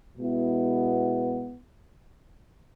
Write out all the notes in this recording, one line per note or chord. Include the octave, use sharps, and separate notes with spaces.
B2 G#3 B3 E4